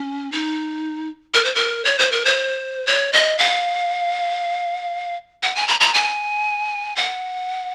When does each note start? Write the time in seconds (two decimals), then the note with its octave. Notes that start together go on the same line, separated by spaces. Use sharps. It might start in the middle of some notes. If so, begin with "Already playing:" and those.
Already playing: C#4
0.32 D#4
1.34 A#4
1.45 C5
1.55 A#4
1.85 C#5
1.99 C5
2.12 A#4
2.25 C5
2.87 C#5
3.13 D#5
3.39 F5
5.43 F#5
5.56 G#5
5.68 A#5
5.80 A#5
5.94 G#5
6.96 F#5